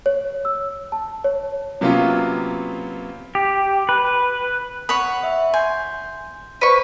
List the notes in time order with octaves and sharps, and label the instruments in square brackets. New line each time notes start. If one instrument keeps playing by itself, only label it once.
[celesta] C#5
E6
A5
C#5
[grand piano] C3 F#3 A#3 B3 C#4 F4
[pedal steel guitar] G4
B4
[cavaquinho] C#5 F#5 B5 [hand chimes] D#6
[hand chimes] E5
[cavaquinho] G#5 [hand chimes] C6 G6
[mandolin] B4 C#6 [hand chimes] C5 D5 B6